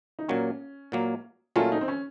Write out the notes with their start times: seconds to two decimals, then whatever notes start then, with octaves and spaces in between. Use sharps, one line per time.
0.19 D#4
0.28 A#2 F#3 A#3 C#4
0.92 A#2 F#3 A#3
1.56 A#2 F#3 A3 C#4 F4
1.72 D#4
1.81 C4
1.88 C#4